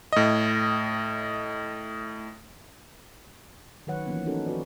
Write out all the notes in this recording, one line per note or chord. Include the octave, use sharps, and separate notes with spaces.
A2 D#5
D#3 F#3 B4 C#5 F#5
E3 F3 A#3 B3 C#4
C#4 D#4 F#4 A4 A#4
F#4 B4 D5